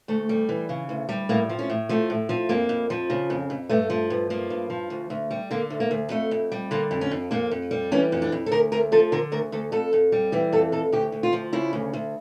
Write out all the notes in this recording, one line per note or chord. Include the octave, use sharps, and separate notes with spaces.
D2 A3
G3
E3
C#3
D2
G3
A2 A#3
F3
C#4
A2
F3 A3
A2
F3
F2 A#3
F2
F3
C#3
F2
F2
G2 A3
F3
G2
F3 A#3
G2
F3
D2
D2
G3
D3 A#3
D2
A#3
D2
F2 A3
F2
G3
D3 A#3
F2
C#4
F2
F2 A#3
F2
G3
E3 C#4
F2
D4
F2
A4
D2 A#4
D2 A#4
F3 A4
D3 A#4
D2 A#4
D2 A4
F2 A4
F2
G3
E3 G4
F2 A4
F2 A4
D2 G4
D2
F4
F3
C#3 E4
D2
D2